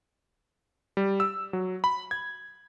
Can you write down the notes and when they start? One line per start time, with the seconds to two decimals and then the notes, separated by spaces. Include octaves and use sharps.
0.97 G3
1.20 E6
1.53 F#3
1.84 B5
2.11 G#6